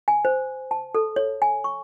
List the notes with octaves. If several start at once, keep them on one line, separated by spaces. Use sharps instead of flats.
G#5
C5
A5
A4
C#5
G#5
C#6